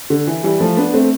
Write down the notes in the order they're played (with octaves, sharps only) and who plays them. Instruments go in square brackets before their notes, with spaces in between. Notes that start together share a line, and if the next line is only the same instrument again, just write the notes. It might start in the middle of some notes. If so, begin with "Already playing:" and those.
[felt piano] D3
E3
E3 G3
F3 A3
B3 D4
A3 C4